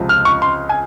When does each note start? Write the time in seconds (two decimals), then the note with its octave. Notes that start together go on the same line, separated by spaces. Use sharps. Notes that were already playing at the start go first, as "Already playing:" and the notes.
Already playing: C#2 C3 F3
0.09 F6
0.25 C#6
0.42 C6
0.69 G#5